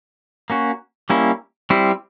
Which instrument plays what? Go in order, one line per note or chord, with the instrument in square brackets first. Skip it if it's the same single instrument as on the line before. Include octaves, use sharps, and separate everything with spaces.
[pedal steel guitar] A#3 C#4 F#4
G3 A#3 C#4 E4
G3 C4 E4